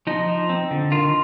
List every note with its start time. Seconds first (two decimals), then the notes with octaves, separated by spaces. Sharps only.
0.07 F3 D#4
0.28 F3
0.49 C4
0.71 D3
0.92 D#3 F4